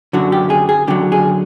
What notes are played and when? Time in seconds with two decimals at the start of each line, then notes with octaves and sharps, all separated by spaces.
0.13 F#2 D3 F#3 F#4
0.32 G4
0.50 G#4
0.69 G#4
0.87 F#2 D3 F#3 G4
1.12 G#4